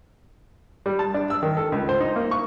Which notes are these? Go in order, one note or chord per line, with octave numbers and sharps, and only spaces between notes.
G3
A5
D4
E6
D#3
A4
C#2
C5
D#4
A#3
C#6